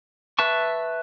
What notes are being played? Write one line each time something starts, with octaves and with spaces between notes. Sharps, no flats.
B4 E5 A5 C#6